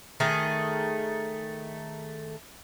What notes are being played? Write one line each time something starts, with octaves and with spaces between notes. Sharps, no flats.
D#3 A3 G#4